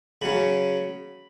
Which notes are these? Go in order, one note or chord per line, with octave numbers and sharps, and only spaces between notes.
C#3 F#3 C#4 B5